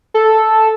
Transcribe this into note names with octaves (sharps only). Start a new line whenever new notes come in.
A4